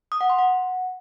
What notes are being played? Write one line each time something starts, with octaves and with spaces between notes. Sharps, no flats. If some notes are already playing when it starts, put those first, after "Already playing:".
D#6
F#5
C6
F#5